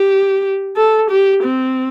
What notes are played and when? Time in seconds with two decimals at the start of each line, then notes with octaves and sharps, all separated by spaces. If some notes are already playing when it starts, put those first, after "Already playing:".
Already playing: G4
0.76 A4
1.10 G4
1.44 C4